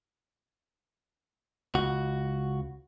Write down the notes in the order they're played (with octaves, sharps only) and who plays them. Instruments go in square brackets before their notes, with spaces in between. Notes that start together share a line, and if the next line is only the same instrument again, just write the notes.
[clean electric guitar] C#2 F#4